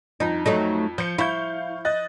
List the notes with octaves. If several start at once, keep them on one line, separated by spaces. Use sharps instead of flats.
F2 D#4
F#3 A3 D#4
F3 G6 C#7
E4 F5 C#6 G6
D#5 F#6 A6